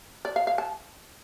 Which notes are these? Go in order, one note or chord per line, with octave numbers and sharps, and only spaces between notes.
D5
F5
F5
A5